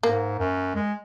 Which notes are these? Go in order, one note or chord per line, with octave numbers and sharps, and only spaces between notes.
G#2 A#3
F#2
G#3